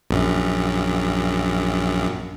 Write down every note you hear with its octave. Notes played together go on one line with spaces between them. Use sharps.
A#1 F#2